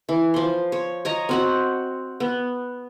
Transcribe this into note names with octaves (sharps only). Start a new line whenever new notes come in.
E3
F3 C6
C#5
C#5 D#5 A#5
C4 F#4 F#5
B3